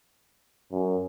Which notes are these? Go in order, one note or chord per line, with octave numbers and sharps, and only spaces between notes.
F#2